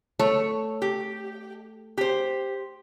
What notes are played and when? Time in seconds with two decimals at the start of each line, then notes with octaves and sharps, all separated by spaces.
0.19 A3 C#5
0.82 G4
1.98 G4 C5